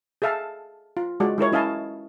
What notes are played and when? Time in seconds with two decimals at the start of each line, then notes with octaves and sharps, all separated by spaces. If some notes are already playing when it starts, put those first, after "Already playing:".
0.22 G#4 A4 E5 F5 A5
0.97 F4
1.20 G#3 F4 F#4 D5
1.38 G#3 E4 A#4 C#5
1.52 C#4 E4 D#5 F5 G#5 A5